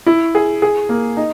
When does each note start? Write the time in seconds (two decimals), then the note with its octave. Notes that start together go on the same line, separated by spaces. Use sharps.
0.06 E4
0.35 G#4
0.62 G#4
0.89 A#3
1.17 D#4